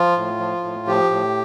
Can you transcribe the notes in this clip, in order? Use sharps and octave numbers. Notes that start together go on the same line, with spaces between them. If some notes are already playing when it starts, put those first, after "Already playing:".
Already playing: F3 F4
A2
F3
A2
F3 G4
A2